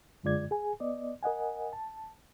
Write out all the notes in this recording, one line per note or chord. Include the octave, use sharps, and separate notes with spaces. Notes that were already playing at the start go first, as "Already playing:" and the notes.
F#2 D3 G#3 F4 D5 G#6
G#4 G#5
B3 D5 D#5
A#4 D#5 F#5 G#5
A5